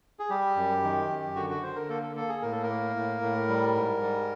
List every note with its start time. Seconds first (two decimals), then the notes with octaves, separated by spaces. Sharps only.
0.19 G#4
0.30 G3 G4
0.56 F#2
0.84 D#3
1.09 F#2
1.36 D3 F#4
1.50 F#4
1.63 D3 C5
1.76 A#4
1.89 A#3 A4
2.02 A4
2.16 A#3 A4
2.29 G#4
2.42 A2 A#4
2.52 A4
2.63 A#4
2.70 A#3
2.96 A2
3.22 A2
3.49 G3
3.75 G#2
4.02 G3